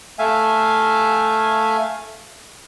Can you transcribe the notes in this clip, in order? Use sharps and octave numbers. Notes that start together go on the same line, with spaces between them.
A3 E5 F5 G#5